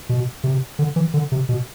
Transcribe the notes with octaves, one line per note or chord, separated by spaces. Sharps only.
B2
C3
D3
E3
D3
C3
B2